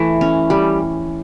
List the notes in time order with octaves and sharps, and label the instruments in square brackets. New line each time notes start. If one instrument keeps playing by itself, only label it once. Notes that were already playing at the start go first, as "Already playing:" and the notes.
Already playing: [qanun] E3 A3
C#4
G3